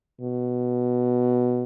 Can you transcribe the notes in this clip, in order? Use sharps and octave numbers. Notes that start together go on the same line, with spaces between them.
B2